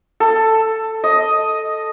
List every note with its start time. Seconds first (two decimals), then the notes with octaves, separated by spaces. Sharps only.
0.20 A4
1.04 D#5